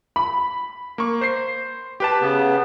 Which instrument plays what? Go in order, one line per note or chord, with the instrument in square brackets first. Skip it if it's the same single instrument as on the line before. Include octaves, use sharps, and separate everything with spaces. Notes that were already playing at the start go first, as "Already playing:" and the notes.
[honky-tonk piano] B5
[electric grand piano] A#3 C#6
C5 C7
G4 B4 A5
[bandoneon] C#3 B3